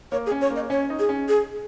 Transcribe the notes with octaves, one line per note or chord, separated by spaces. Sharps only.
A#3 C#5
G#4
C#4
C#5
A#3
D#5
C#4 C#5
D#4
G#4
C#4
G#4